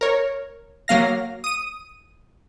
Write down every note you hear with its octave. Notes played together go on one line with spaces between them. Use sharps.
A#4 C#5
F#3 A#3 F5 A#6
D#6 D#7